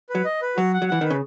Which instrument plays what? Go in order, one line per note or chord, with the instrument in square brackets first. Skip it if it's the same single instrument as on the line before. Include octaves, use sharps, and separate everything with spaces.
[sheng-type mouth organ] B4
[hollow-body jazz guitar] F#3
[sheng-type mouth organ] D#5
B4
[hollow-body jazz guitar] F#3 [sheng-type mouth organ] F#4
[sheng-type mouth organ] F#5
[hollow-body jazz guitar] F#3
[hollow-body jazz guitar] E3 [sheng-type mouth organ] F#5
[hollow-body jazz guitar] D#3 [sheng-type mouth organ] B4
[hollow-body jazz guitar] C#3